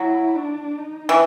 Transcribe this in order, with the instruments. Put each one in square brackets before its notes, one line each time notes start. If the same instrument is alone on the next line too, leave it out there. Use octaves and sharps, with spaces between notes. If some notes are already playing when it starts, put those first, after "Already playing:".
Already playing: [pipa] F#3 [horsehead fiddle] E4
[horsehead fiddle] D4
D#4
[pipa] E3